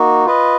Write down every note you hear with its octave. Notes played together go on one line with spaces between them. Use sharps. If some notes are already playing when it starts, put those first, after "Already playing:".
Already playing: A#3 D#4 F#4
F4 B4 D#5